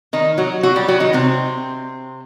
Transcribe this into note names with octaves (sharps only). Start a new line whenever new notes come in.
D#3 D#4
F#3 F#4
F#3 F#4
G3 G4
F#3 F#4
D#3 D#4
C3 C4